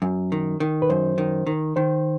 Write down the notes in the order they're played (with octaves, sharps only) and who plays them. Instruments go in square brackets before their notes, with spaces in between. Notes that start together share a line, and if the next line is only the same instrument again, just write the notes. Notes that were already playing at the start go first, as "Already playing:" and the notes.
[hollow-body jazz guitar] F#2
D#3
D#3
[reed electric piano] B4
[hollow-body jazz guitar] F#2 [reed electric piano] C5
[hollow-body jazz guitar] D#3
D#3
[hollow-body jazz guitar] D#3 [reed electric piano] C5